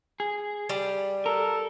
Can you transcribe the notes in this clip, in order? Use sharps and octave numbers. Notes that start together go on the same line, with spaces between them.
G#4
G3
A4 A#4